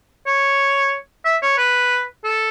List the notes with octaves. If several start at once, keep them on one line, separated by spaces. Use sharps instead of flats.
C#5
E5
C#5
B4
A4